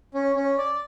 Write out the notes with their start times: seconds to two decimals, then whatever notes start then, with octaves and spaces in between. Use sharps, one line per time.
0.14 C#4
0.36 C#4
0.58 D5